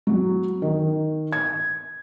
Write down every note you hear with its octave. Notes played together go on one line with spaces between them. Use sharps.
F#3
D#3
G#6